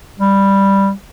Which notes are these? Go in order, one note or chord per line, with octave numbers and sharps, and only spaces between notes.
G3